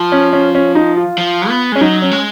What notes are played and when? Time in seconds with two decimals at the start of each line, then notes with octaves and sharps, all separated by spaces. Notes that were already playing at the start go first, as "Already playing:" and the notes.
Already playing: F3
0.12 C#4
0.33 C#4
0.55 C#4
0.75 D#4
0.97 F4
1.18 F3
1.49 B3
1.72 G#3 C#4
1.81 F#3 D#4
2.02 C#4
2.11 G#3